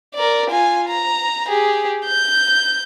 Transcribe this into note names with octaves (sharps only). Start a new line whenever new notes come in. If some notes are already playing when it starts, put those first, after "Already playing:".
A#4 D5
F4 G#5
A#5
G4 G#4
G6